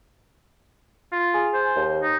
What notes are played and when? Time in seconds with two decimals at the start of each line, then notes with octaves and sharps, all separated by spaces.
1.12 F4
1.34 G#4
1.54 C5
1.76 D#2
2.03 D#4